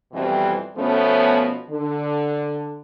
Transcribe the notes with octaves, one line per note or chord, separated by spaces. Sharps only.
F2 B2 E3 G3 C4 E4
B2 F3 A3 B3 C#4
D3